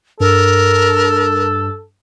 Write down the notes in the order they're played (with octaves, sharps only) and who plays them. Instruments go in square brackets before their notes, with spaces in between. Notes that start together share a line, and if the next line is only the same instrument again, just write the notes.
[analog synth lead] G2 [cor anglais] A4 [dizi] A#4